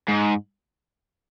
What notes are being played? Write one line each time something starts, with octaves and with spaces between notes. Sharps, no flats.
G#2